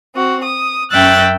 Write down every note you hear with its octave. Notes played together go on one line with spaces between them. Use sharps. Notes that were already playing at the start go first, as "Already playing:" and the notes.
C4 F#4
D#6
F#2 C#4 E5 G5 F#6 A6